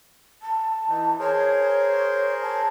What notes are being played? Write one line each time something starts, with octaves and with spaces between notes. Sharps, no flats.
A5
E3 D#4
G#4 A#4 C5 C#5
A5